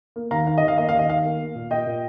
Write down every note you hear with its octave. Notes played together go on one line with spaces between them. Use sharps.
A#3
D#2 F5 A#5
D#3 F5
D#5
D#2
F5
A#3 D#5
F5
D#2
D#5
D#2 F5
A#3
A#3
A#2
A#2 D#5 G5
A#2